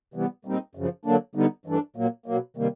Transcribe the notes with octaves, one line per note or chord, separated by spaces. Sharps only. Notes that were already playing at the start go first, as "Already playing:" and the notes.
C3 E3 G3 B3
A#2 G3 C4 D#4
F#2 C#3 F3
D3 F#3 A#3 D4
D3 G3 B3 D#4
G2 E3 A3 D4
A#2 F#3 A#3
B2 F#3 A#3
C3 D#3 G3 A#3